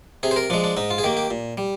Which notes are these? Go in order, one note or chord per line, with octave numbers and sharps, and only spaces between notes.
C3 G#4
C5
A#4
F3 G#3 D4
D4
G#2 D#4
F4
G#4
D#3 A#3 G4
G4
A#2
G3